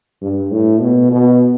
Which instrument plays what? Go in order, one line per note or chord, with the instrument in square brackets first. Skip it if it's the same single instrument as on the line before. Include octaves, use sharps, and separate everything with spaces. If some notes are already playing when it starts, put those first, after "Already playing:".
[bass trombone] G2
A2
B2
B2